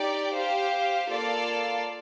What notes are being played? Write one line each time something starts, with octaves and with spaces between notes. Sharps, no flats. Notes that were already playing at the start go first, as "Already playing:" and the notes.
Already playing: D#4 G4 D5 G5
G4 C5 F5
A#3 F4 A4 D5 F5